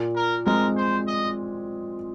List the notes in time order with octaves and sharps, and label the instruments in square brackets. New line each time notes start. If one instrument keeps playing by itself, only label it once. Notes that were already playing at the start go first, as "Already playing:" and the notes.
Already playing: [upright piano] A#2
[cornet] A#4
[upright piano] G#3 C4 [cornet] A#4
[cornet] C5
D#5